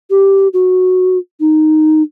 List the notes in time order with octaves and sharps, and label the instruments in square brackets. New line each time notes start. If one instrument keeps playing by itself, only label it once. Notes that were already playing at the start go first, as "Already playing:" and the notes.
[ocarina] G4
F#4
D#4